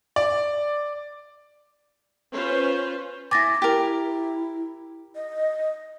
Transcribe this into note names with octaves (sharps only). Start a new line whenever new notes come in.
D5
C#4 F4 B4 C5
E4 G#5 D6 A6 A#6
E4 G4 A#4
D#5